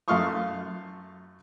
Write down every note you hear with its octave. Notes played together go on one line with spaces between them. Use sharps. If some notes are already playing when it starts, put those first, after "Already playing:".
F#2 A3 F5 C6 C#6 D#6